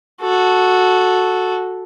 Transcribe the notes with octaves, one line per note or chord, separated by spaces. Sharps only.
F#4 A4